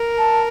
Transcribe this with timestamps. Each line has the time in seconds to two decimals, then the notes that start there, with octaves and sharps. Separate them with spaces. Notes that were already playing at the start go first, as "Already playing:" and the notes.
Already playing: A#4
0.18 A5